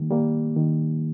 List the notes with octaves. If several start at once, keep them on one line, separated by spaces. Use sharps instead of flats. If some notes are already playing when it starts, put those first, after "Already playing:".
Already playing: D#3 G3 A#3
G3 A#3
D#3